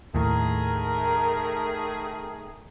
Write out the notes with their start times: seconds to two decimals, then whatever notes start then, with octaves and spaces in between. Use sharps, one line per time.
0.15 D#2 A2 D#3 A3 G#4 A#4